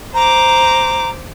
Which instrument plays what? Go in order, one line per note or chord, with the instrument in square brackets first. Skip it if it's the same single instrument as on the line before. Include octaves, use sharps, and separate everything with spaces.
[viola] C5 D6 [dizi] A#5